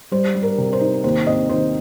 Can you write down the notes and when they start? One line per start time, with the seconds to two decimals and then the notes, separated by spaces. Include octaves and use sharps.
0.12 G3 C5
0.35 G3
0.43 A#4
0.58 C3
0.73 C5
0.80 D#4
1.04 D#2 C5
1.27 C4 D#5
1.49 D#3 C5